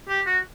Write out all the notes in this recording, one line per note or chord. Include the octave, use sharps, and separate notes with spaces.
G4
F#4